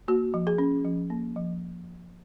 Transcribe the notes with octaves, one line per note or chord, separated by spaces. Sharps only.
A#3 F#4
F3
G#4
C#4
F3
A#3
F3